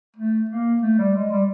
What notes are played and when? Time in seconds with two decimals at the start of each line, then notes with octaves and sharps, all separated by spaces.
0.16 A3
0.49 A#3
0.82 A3
0.98 G3
1.15 G#3
1.31 G3